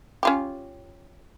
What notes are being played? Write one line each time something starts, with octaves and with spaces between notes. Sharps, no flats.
C#4 F4 G4